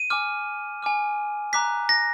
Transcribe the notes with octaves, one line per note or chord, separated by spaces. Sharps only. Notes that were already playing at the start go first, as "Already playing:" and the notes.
Already playing: D#7
G#5 D6 F6
G#5 D6 F6
A#5 D6 F#6 B6
A#6